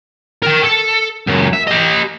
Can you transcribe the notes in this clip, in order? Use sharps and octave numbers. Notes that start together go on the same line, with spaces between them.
A#4 G5
A4
C#2 F#2
E5
G4 D#5